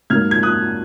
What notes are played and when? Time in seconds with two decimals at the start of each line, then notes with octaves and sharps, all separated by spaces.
0.10 G#2 F#3 A#3 F6 G#6
0.31 G#6
0.43 D#6 F#6